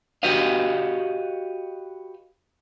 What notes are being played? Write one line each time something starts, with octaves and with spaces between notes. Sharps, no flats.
F#4 G4 B4 D#5 F5